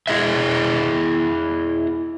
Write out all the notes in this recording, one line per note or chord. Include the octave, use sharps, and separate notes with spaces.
E4 G#4 D#5 E5